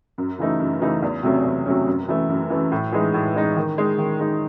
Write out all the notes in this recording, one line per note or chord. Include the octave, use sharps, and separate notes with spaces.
F#2
C#3 E3 A3 D#4
F#2
C#3 E3 A3 D#4
E2
C3 F#3 A3 C#4
E2
C3 F#3 A3 C#4
F#2
E3 A3
F#2
E3 A3
A2
E3 G#3 D#4
A2
E3 G#3 D#4
D#3
G#3 D#4
D#3
G#3 D#4